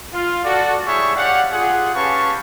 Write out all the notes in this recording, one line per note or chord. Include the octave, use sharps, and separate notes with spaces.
F4 F5
F#4 A4 D5
G3 E4 G#4 C#5 E5 C#6
G4 C#5 D5 F5 F#5
F4 G4 G#4 F#5
C#4 G4 B4 F5 A5 C#6